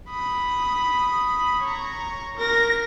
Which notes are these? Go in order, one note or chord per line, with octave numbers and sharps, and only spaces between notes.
B5 D#6
C#5 A#5
A#4 A#6